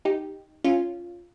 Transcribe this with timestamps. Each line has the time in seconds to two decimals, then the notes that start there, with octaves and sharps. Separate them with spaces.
0.05 D#4 G4
0.64 C#4 F4